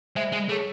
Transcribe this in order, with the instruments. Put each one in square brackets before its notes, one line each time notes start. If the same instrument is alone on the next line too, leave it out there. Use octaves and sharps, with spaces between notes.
[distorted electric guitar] G#3 [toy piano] C5 E5 G#5
[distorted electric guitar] G#3
[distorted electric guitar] A3 [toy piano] G#4 C#5 G#5 C#6